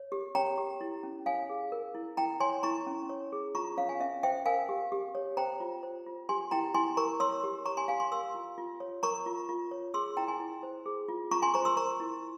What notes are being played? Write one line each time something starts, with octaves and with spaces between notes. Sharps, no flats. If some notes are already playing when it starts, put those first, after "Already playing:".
Already playing: C#5
G4
C#5 G5 A#5
G4
E4
C#4
C#5 F5 G#5
G#4
A#4
E4
E4 G5 A#5
C#5 G#5 C6
E4 A#5 C#6
C#4
C#5
G#4
F4 A#5 C#6
C#4 C#5 F5
F5 G#5
C#4 E5
C5 E5 G5
A#4 F5 G#5
G4
G4
C#5
C5 G5 A#5
F4
C5
F4
G4 G#5 C6
E4 G5 A#5
E4 G#5 C6
A#4 A#5 C#6
C#5 C6 E6
G4
C#5 A#5 C#6
G#5 C6
G4 F5 G#5
G#5 C6
A#4 C6 E6
F4
F4
C#5
A#4 A#5 C#6
F4
F4
C#5
G#4 C6 E6
E4 G5 A#5
G#5 C6
E4
C5
G#4
F4
F4 A#5 C#6
G#5 C6
C5 A#5 C#6
C6 E6
A#4 A#5 C#6
E4